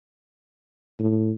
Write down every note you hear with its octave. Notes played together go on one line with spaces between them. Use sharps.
A2